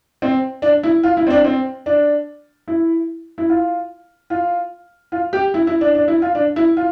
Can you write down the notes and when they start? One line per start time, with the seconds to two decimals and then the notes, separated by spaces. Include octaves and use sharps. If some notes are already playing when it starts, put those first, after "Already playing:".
0.22 C4
0.62 D4
0.83 E4
1.03 F4
1.17 E4
1.27 C4
1.30 D4
1.44 C4
1.86 D4
2.68 E4
3.38 E4
3.49 F4
4.30 F4
5.12 F4
5.33 G4
5.54 E4
5.67 E4
5.81 D4
5.95 D4
6.08 E4
6.22 F4
6.35 D4
6.56 E4
6.77 F4